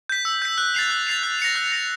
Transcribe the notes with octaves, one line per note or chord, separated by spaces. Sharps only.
G6 B6
E6
G6 B6
F#6
A6 C7 F7
F#6
A6 C7 F7
F#6
A#6 C#7 F7
F#6
A#6 C#7 F7